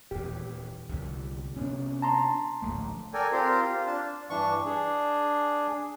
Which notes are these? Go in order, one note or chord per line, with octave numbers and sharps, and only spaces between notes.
D#1 E2 E3 G4
C2 D3 G3
C3 B3 C#4 D4
A5 A#5 C6
D1 A#1 A3
A4 A#4 D5 G5 G#5
C4 F4 G4 A#4 C5
F4
D4 A5
G2 E3 D4 C#6
D4 G#4